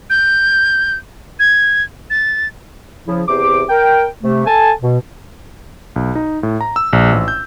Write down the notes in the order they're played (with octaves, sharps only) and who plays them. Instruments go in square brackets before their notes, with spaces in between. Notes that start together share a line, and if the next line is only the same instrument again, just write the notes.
[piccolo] G6
G#6
A6
[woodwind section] C#3 F3 E4
E2 C3 C5 D6
A#4 G5
C3 A3
A4 G#5 A5
B2
[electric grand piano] B1
D#4
A2
A#5
E6
A#1
A1
G6